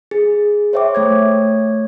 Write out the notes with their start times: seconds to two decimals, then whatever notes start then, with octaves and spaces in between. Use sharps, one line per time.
0.11 G#4
0.73 C5 C#5 E5 G5 D6
0.95 A3 C#5 G#6